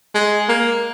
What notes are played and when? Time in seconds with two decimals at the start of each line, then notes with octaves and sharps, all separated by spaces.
0.15 G#3
0.49 A#3